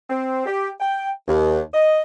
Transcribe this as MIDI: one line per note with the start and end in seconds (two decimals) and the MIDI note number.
0.09 0.43 60
0.46 0.70 67
0.80 1.10 79
1.28 1.60 39
1.74 2.02 75